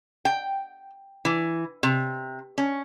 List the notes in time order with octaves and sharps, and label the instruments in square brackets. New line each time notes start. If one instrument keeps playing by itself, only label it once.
[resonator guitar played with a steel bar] G5
E3
C3
C#4